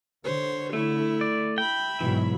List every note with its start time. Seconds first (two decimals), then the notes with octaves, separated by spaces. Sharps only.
0.24 D3 C5 C#5
0.73 A3 E4
1.21 D5
1.58 E5 G5 B5
2.01 G#2 B2 E3 F#3